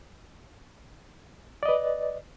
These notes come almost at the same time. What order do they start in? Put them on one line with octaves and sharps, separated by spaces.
D5 D#5 B4